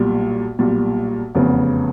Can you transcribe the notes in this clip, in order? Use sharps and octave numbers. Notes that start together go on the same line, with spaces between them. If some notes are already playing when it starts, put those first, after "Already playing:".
Already playing: B1 A#2 G3
B1 A#2 G3
F1 E2 C#3 B3